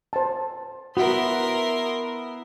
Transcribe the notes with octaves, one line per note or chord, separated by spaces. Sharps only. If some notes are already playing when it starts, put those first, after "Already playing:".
C5 A5
B3 E4 F#4 A#4 C6